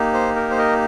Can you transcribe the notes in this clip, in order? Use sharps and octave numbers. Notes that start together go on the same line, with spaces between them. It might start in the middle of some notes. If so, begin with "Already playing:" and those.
Already playing: A#3 D#4 G4
C5
A#4
C5
A#4 D#5